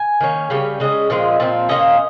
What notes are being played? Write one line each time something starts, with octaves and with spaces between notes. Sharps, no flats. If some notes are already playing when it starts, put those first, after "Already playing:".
Already playing: G#5
D#3 A#3 C#4
C#3 G3 C#4 G5
C#3 G#3 C#4 D#5
A#2 F3 G#3 C4
A#2 F3 C4
A#2 G3 A#3 C#4 D#5